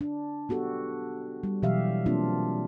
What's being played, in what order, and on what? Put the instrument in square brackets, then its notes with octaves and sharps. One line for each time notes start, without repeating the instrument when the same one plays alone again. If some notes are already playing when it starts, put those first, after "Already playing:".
[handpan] D4
B3 F#4 G4 A4
G3
B2 E3 F#3 G4 E5 F5
A#3 C4 D4 F4